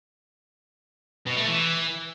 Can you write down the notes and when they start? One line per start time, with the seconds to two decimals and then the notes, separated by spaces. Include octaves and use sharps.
1.27 B2
1.37 A3
1.47 E3